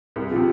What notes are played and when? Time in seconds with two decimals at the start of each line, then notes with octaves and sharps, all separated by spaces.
0.16 C2
0.31 C3 F3